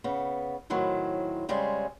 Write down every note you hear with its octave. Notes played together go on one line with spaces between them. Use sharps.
C#3 B3
A2 D#3 F#3 C4 E4
C#3 G3 G#3 C4 G#4